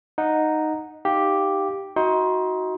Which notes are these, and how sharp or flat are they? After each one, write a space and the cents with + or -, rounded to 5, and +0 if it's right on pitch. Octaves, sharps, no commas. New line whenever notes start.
D#4 -5 F#5 -15
D#4 +0 G4 +0 F5 +0
D#4 +30 F#4 +0 C6 +0